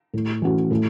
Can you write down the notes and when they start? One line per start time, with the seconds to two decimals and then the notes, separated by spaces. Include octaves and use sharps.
0.14 A2
0.42 E3 A3 C#4 F#4
0.71 A2